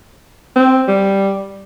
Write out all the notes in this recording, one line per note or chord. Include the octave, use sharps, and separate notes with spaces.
C4
G3